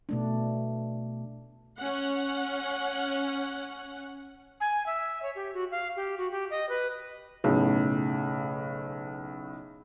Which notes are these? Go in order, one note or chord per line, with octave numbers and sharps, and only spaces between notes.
B2 A3 D4
C#4 F#5
G#5
E5
C#5
G4
F#4
F5
G4
F#4
G4
D#5
B4
B1 A2 C#3